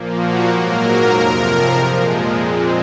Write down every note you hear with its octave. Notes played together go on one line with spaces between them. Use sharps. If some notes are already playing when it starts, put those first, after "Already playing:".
Already playing: A#2 F3 A#3
F#4
G#2 F#3 A#3 A#4
F2 C3 F3
A#2 F3 G#3
A#2 G#3 C4